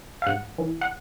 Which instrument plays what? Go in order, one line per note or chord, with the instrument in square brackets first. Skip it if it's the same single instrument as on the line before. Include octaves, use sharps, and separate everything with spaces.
[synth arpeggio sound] F5
G#2 F#5
E3
F#5